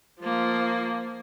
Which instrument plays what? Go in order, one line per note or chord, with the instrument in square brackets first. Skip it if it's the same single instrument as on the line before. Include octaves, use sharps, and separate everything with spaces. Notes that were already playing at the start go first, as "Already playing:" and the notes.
[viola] F3 A#3